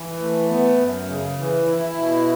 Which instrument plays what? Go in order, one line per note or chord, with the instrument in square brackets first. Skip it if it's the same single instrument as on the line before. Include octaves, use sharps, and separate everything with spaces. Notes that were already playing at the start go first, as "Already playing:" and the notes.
Already playing: [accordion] E3
A3
B3
F#2
C#3
E3
E4
B2